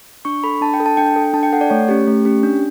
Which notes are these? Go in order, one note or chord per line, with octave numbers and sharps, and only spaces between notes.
D4 C#6
A4 B5
D4 A5
G5
A4
A5
D4 G5
A4
D4 A5
G5
A4 F#5
D5
A3 C#5
C#4 G4
A3
C#4 G4
D4